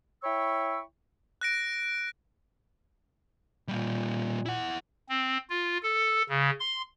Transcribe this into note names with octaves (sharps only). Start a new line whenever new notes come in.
E4 C#5 G5 B5 C#6 E6
F#6 A#6 D7
A#2 G3 A#3
E4 F#5
C4
F4
A4
C#3
C6